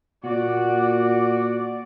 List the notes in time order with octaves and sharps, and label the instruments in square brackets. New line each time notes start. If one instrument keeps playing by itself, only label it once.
[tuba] A#2 [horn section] F#4 [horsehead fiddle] D5